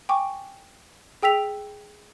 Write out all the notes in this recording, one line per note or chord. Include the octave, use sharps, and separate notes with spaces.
G5 G#5 C#6 D6
G#4 G5 E6 B6 F7